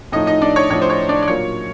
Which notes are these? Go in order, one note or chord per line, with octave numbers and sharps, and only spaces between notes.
A2 F3 A3 D#4 D#5
D#4 D#5
D4 D5
C#5
A2 F3 A3 C#5
C5
C#5
D4 D5
D5
A#2 F#3 A#3 C#5